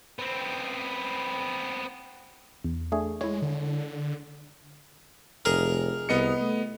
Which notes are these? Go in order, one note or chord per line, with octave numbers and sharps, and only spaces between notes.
B3 C4
E2
A3 D4 G#4
G#3 E4 C#5
D3
F1 G#4 A#4
C2 B3 D#5 C#7
A3